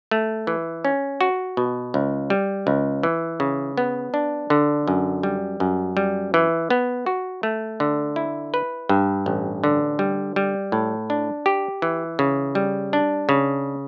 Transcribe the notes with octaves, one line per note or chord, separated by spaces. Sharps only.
A3
E3
C#4
F#4
B2
C#2
G3
C#2
E3
C#3
B3
D4
D3
F#2
G3
F#2
G3
E3
B3
F#4
A3
D3
E4
B4
G2
A1
D3
G3
G3
A2
D4
G4
E3
C#3
G3
D4
C#3